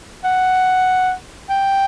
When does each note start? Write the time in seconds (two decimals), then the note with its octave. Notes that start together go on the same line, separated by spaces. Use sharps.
0.24 F#5
1.50 G5